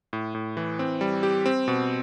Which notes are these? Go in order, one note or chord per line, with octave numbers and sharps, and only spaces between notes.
A2
A2
E3
C4
G3
G4
C4
B2